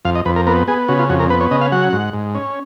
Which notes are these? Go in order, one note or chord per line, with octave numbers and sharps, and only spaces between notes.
F2 F5
D#5
F2 B4
A#4
B3 A#4
B3 G#4
C#3 F#4
F4
F2 F#4
A#4
B3 B4
C#5
C#3 D#5
F5
F#3 F#5
G#2
G#2
C#4